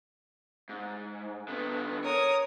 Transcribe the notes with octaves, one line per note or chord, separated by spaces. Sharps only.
G#2
D3 B3
A#4 C#5 D#6